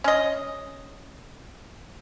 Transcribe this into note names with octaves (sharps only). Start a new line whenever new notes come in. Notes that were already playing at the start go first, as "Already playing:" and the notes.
C#4 D#5